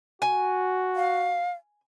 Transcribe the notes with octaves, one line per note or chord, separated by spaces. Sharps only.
F#4 G#5
F5